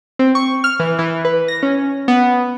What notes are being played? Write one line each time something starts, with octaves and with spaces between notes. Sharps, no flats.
C4
C#6
F6
E3
E3
B4
A#6
C#4
B3